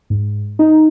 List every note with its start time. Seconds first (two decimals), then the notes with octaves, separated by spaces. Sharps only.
0.10 G#2
0.59 D#4